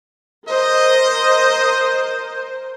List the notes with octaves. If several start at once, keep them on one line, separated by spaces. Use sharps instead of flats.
A#4 C5 D#5